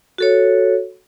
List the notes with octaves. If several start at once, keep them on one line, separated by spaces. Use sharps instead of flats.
F#4 A4 C#5